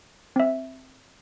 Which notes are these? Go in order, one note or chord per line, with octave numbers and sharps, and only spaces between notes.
C4 E5